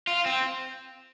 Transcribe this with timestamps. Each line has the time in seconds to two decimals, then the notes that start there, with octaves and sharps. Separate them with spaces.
0.07 F4
0.26 C4